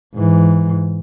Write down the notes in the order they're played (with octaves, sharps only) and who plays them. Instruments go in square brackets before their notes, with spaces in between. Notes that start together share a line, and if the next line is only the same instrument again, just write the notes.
[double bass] G#2 E3